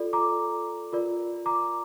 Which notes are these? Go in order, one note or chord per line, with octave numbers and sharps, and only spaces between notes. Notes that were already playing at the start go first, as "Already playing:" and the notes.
Already playing: F4 A4 D5
A#5 D6
F4 A#4 D5
A#5 D6